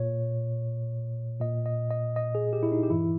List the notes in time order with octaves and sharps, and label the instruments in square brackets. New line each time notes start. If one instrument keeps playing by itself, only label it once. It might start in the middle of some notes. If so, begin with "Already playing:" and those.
Already playing: [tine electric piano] A#2 C#5
A#2 D#5
D#5
D#5
D#5
G#4
G4
E4
D#4
G4
G2 E3 E4